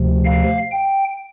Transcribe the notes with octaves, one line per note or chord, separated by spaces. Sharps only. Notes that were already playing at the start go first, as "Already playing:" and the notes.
Already playing: D2 C3 F3
F5
G5